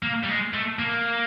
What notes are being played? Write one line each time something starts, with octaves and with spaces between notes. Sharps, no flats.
A#3
G3
G#3
A3
A#3